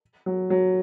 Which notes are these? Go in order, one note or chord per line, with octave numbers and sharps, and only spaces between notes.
F#3
F#3